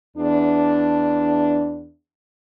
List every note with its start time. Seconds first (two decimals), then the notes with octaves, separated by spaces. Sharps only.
0.17 E2 D4